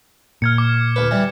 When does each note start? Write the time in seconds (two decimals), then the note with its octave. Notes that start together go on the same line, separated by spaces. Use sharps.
0.42 A#2 F6 G#6 C#7
0.58 D6
0.96 D2 B4
1.11 E3 G3